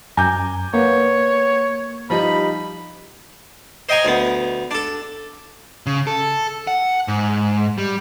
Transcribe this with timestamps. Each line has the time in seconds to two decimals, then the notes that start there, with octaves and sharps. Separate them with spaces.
0.17 F#2 G#5 A#5 D6 G6
0.74 A#3 B3 C#5
2.10 F3 G3 D#4 B5
3.89 C5 D#5 G5 G#5 A#5 C#6
4.05 D2 B3
4.71 D4 A4
5.86 C#3
6.07 A4
6.67 F#5
7.08 G#2
7.78 G3